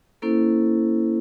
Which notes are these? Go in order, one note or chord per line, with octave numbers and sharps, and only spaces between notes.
A#3 C#4 E4 A4 C5